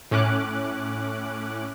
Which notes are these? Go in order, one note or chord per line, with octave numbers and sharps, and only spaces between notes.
A2 C#4 D6 F#6